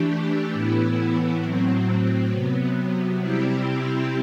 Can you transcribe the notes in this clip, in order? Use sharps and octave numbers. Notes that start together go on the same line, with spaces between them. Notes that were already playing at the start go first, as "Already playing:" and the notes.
Already playing: E3 A3 D4 G4
A2 E3 B3 E4
A2 F#3 C4
C3 F#3 B3
C3 G3 C4 E4 G4